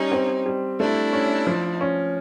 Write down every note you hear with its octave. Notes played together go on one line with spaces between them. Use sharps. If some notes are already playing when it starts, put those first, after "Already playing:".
Already playing: G3 C#4 D#4
C4
G3
A3 D4 E4
C#4
F3
C#4